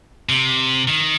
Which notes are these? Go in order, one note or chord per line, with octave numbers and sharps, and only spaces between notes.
C3
D#3